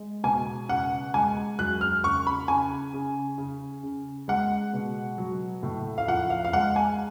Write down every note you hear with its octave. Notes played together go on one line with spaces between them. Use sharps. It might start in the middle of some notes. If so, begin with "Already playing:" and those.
Already playing: G#3
B2 G#5
C#3 F#5
G#3 G#5
F#3 F#6
F6
C#3 C#6
B5
C#3 G#5
C#3
C#3
C#3
G#3 F#5
B2
F#3
A2
F5
F3 F#5
F5
F5
G#3 F#5
G#5